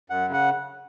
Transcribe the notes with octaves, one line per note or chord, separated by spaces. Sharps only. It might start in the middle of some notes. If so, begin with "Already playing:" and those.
F#2 F#5
C#3
F#5